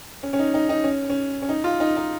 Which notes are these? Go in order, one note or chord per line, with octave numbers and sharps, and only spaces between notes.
C#4
C#4
D#4
D#4
D#4
C#4
C#4
C#4
D#4
F4
D#4
D#4